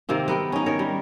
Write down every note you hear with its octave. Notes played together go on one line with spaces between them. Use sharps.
C3 D#3 A#3 C4
B3 A#4 G5
C#4 D#4
D#3 A#4 C#5
G3